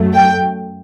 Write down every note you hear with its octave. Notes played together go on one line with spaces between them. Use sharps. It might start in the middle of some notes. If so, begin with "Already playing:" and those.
Already playing: F#2 F#3 A3
G5